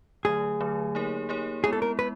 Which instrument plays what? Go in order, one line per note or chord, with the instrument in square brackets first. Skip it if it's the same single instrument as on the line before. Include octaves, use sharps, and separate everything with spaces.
[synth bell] D3 F#3 A3 [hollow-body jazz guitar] G#4
[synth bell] D3 F#3 A3
A#3 D#4 G4 A#4 C#5
A#3 D#4 G4 A#4 C#5
[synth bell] G#3 B3 E4 [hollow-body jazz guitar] G#4
[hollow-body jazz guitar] A4
A#4
[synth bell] G#3 [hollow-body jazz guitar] B4